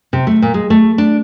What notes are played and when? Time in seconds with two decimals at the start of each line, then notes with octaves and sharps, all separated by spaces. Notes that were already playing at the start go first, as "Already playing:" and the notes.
0.13 C3
0.27 A3
0.42 A#2
0.54 G#3
0.70 A3
0.98 D4